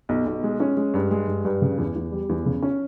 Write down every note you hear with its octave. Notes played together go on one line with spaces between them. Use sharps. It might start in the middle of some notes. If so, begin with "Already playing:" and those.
B1
B1
G#3
C#4
G#3
G2
G#3
G2
G2
C#3
E2
E2
G3
E2
C#3
C#4